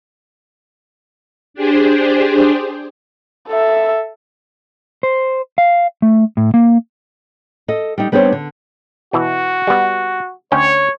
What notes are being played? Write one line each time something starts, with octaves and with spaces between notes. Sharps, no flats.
D4 G4 G#4 C5
A4 E5
C5
F5
A3
A2
A#3
A4 D#5
G3 D#4
G3 B3 C4 D4 B4 C#5
D3
B2 E3 F#4
G3 B3
D2 C#4 C#5 G5